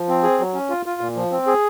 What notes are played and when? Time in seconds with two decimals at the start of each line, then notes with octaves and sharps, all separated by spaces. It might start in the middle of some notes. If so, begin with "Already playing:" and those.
Already playing: F3
0.09 C4
0.23 G#4
0.40 F#3
0.54 C#4
0.70 F4
0.86 F4
1.01 A#2
1.16 F3
1.31 C4
1.47 G#4